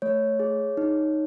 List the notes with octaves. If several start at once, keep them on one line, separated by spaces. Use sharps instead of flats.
A3 C#5
G#4
D#4